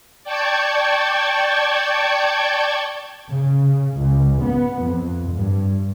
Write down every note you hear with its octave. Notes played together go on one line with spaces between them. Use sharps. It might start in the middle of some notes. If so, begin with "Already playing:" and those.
D5 G5 A5 C#6 G6 G#6
C#3
C#2
B3
F2
G2